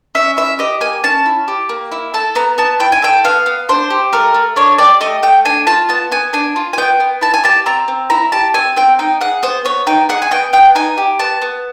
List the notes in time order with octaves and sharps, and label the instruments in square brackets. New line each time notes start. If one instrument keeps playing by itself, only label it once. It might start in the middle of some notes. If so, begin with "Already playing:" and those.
[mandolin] C#4 E5
E4 E5
G4 D#5
A#3 G#5
C#4 A5
E4
G4
A#3
E4
A4 A5
B3 A#5
B3 A5
E4 G5
G#5
A4 G5
B3 F5
B3
D4 C5
G4
A3 A#4
A3
D4 C#5
G4 D5
A3 D#5
A3 G5
D4 G#5
F4 A5
B3 A5
B3 G#5
D4 G#5
F4
G#5
B3 G5
B3
E4 A5
G#5
G4 A5
C4 A#5
C4
E4 A#5
G4 A5
C4 G#5
C4 G5
D#4 G5
G#4 F#5
B3 C5
B3 C#5
D#4 G5
G#4 F#5
G#5
B3 G5
B3 G5
D#4 G#5
G4
B3 A5
B3